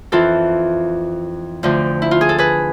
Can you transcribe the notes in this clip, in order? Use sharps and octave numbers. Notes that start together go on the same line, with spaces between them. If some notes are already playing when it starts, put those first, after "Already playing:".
F2 E3 F4 A4
D2 D3 F3
E4
F4
G#4
A4
G#4 B4